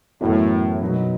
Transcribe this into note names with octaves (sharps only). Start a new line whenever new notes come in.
F#2 A2 E3 B3 F#4
B2 F#3 B3 D#4 F#4